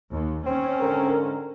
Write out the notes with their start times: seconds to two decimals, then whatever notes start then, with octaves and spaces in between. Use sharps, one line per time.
0.11 D#2
0.46 C4 C#4
0.79 G#2 D3 A#4